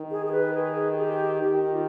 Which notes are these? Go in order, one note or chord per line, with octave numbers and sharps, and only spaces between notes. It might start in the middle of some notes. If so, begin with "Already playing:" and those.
Already playing: D#3
G#4
G#4
B4
G#4
G#4
G4
D#3 G4
F4